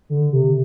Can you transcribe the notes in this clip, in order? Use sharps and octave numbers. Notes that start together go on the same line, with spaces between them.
D3
C3